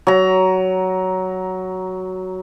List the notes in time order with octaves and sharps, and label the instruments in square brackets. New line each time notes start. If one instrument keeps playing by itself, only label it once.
[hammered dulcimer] F#3 A#5